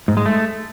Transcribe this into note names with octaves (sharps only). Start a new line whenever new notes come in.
G#2
G#3
A3